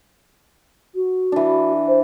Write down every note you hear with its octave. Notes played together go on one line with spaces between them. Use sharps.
F#4
E3 D4
C5